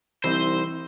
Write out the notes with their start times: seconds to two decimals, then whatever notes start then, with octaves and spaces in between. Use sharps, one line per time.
0.24 C2 E3 D#4 C5